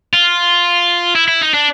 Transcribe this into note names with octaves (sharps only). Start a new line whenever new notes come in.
F4
E4
E4
D#4
D4